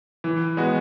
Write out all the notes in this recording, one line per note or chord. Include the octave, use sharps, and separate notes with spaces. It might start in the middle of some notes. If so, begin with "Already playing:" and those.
E3
G#3 B3 F#4